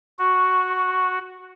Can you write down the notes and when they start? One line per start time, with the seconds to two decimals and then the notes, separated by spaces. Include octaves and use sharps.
0.19 F#4 C#6